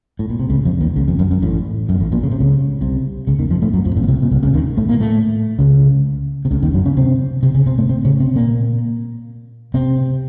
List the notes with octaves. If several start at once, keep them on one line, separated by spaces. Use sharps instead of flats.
A2
A#2
C3
C#2 C#3
F2 F3
D#2 D#3
C#2 C#3
F2
F#2
F#2
A1 A2
F#2
A#2
A1 A2
A#1 A#2
C#3
C3
C#2 C#3
C2 C3
C#2 C#3
D#2 D#3
F2 F3
A2 A3
F#2 F#3
F2 F3
A1 A2
A#2
C2 C3
A#2
C2 C3
C#2 C#3
D#2 D#3
A2 A3
A#2 A#3
A2 A3
C#2 C#3
C3
C#2 C#3
D#2 D#3
F#2 F#3
C#3 C#4
C3 C4
C3 C4
C#3 C#4
C3 C4
A2 A3
C3 C4
C#3 C#4
C3 C4
A#2 A#3
C3 C4